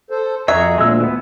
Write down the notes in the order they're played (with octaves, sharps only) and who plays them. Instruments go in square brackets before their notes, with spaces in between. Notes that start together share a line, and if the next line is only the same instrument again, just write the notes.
[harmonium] A4 C5
[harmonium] F2 A#5 [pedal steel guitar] F#4 G#4 C#6 [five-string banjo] E5
[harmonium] D2 A#2 [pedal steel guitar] G#3 E6
[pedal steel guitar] E3 B3